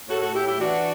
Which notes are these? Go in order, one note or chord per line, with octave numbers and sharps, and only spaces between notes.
A2 F#4 A4
F#4 A4
A2 E4 G4
E4 G4
E3 D4 F#4